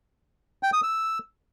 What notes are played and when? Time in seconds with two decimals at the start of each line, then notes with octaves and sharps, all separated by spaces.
0.63 G5
0.73 D#6
0.83 E6